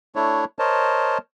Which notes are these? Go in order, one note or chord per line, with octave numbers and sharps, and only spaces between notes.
A3 D4 E4 C#5
A#4 C5 C#5 D#5 A5